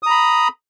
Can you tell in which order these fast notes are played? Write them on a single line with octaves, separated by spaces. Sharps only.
D#6 A#5 B5